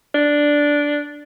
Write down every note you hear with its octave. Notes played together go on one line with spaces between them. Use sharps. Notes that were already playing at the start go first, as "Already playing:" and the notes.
D4